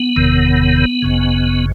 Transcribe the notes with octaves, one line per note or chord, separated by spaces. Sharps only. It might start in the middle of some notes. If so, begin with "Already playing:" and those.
Already playing: B3
F#1 E2 C3 D#3
G#1 F#2 C#3